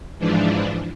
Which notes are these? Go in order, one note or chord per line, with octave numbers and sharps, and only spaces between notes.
G#2 E3 F3 D4